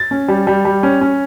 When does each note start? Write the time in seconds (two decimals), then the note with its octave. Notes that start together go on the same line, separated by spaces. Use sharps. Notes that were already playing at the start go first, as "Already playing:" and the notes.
Already playing: A6
0.11 C#4
0.28 G3
0.47 G3
0.65 G3
0.83 C#4
1.01 C#4